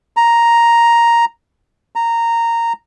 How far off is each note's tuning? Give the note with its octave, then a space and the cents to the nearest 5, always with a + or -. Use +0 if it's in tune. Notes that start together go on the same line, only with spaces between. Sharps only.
A#5 +5
A#5 -10